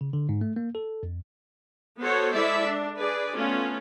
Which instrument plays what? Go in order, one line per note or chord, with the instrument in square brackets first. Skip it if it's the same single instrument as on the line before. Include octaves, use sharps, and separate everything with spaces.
[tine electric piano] C#3
D3
G#2
A3
A#3
A4
F2
[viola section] B3 F#4 A4 C5 C#5 F#5
G#3 E4 A4 D5 E5
D4
G#4 B4 D5
A3 B3 C#4 F4